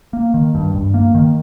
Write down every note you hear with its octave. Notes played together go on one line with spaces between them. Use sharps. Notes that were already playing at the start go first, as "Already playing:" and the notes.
A#3
D#3
G2
G2
A#3
D#3